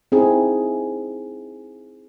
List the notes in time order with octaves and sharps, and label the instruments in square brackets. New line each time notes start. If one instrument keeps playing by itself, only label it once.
[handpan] C4 D#4 E4 G#4